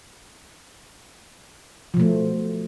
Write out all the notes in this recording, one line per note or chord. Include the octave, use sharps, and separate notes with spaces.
B2 F3 A3